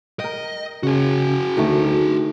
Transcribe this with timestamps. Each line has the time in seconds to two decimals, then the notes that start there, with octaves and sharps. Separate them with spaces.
0.20 A#4 D#5 G5
0.83 C#3 F#4 G#4
1.57 D2 D#3 A3